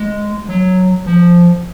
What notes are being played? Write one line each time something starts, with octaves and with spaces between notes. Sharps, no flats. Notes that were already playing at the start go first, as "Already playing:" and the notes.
Already playing: G#3
F#3
F3